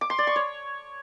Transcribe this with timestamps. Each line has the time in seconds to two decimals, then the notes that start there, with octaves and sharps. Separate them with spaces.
0.01 D6
0.10 C6
0.19 D5
0.27 C#6
0.36 C#5